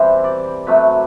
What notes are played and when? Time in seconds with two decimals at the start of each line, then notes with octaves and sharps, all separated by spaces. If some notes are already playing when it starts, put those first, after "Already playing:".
Already playing: C3 E3 G3 C5
0.24 D5
0.67 C3 F#3 A3 B4